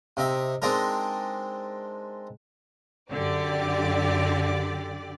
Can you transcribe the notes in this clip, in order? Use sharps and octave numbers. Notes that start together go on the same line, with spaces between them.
C3 D#4 E5
G#3 C4 D4 D#4 A#4
F#2 D3 G4 D5